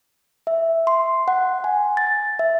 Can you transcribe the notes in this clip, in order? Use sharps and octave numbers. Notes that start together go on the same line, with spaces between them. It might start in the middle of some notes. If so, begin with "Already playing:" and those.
E5
C6
F#5
G#5
A6
E5